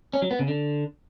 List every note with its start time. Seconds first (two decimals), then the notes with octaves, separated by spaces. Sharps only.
0.13 C#4
0.22 F#3
0.31 B3
0.39 C#3
0.48 D3